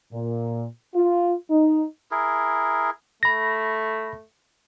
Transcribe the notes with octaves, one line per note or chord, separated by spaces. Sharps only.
A#2
F4
D#4
E4 G#4 A#4
A3 B5 A#6